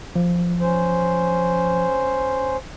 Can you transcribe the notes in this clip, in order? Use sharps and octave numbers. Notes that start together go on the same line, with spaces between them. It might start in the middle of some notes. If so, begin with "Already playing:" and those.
F3
C#4 C5